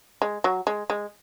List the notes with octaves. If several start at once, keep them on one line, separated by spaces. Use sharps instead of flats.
G#3
F#3
G#3
G#3